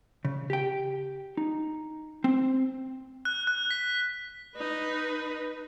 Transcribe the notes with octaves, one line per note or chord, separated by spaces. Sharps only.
C#3
G4 G5
D#4
C4
F#6
F#6
B6
D#4 B4